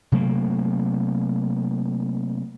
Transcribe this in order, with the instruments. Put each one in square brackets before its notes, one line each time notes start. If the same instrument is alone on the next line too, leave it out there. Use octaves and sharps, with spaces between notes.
[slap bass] C3 F#3 A3 A#3